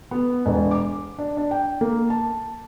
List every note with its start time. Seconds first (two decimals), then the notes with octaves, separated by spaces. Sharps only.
0.11 B3
0.45 E1
0.71 D6
1.18 D4
1.37 D4
1.51 G5
1.81 A#3
2.10 A5